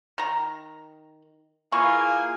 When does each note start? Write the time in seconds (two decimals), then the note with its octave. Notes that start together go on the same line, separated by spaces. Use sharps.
0.18 D#3 A#5
1.72 E3 A#3 F4 G#4 G#5 C#6